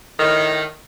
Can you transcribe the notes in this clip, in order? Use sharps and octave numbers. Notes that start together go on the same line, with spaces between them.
A2 D#3